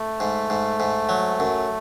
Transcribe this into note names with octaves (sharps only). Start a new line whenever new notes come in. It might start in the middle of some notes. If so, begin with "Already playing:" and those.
Already playing: A3
G#2
G#2
G#2
F#3
F#2